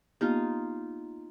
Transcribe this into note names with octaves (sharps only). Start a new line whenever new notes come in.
A#3 B3 D#4 F4 G4